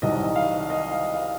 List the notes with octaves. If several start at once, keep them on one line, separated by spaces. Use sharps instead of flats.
C2 C3 D#3 F#3 D#5
F5
D#5
F5
F5